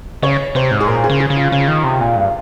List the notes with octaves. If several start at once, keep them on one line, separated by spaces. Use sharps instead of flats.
C#3 C#5
C3 C5
G#2
G#4
A#2 A#4
G#4
C#3
G#4
C#3
F4
C#3 F4
D#3
C3
A#2
G2